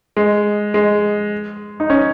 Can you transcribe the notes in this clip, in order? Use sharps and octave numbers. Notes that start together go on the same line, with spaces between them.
G#3
G#3
D#4
C#4